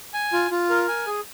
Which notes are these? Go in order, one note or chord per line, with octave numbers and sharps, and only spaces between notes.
G#5
F4
F4
A#4
G#5
G#4